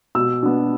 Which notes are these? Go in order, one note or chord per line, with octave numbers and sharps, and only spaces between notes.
B2 E6
B3 D4